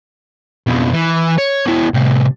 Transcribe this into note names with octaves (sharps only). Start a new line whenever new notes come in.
F2 B2
E3
C#5
B2 E4
A2 C3